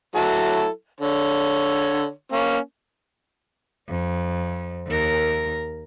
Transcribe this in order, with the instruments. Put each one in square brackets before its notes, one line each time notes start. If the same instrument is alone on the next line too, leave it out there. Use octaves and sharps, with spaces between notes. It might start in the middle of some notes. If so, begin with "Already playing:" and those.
[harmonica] F#3 E4 A4
D3 C#5
A#3 C#4
[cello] F2
D#2 A#4